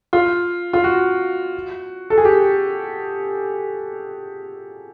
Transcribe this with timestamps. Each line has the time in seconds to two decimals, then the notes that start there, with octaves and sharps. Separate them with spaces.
0.13 F4
0.73 F4
0.84 F#4
2.10 A4
2.18 G#4
2.25 G4